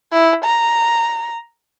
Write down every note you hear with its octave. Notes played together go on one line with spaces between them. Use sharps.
E4
A#5